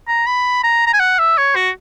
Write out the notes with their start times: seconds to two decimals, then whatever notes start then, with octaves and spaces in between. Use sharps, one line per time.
0.08 A#5
0.26 B5
0.64 A#5
0.86 A#5
0.93 G#5
1.00 F#5
1.18 E5
1.38 C#5
1.55 F#4